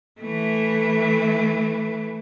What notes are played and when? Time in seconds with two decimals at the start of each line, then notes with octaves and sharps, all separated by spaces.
0.21 E3 A3